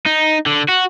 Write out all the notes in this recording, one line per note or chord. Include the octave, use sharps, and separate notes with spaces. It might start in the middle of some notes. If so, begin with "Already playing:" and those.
D#4
D3
F#4